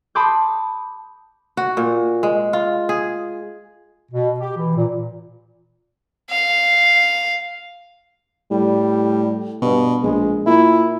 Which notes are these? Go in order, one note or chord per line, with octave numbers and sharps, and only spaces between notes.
A5 B5 C6 D6 D#6 G6
F#4
A#2
G#3
F4
G#4
B2
G4
E3
A#2
F5
A2 G3
G2 B2
A#1 G#3
A#2 E4